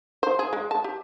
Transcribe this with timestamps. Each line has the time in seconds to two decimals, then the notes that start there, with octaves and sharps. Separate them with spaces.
0.23 C5
0.39 G#4
0.53 G#3
0.71 A5
0.84 G4